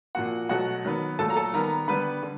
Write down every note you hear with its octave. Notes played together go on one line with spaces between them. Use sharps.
A#2 F3 A#3 F#4 F#5
B2 F#3 A3 F#4 F#5
D#3 F#3 B3
A#2 F#3 A3 A4 A5
A#5
A4 A5
D#3 G3 B3 A#4 A#5
D3 G3 B3 B4 B5
D3